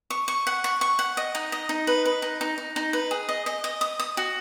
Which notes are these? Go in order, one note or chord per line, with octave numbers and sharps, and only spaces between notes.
C#6
C#6
F#5
C#6
C#6
F#5
D#5
D#4
D#5
D#4
B4
B4
D#4
D#4
D#4
D#4
B4
G#4
D#5
D#5
D#5
D#6
D#6
F#4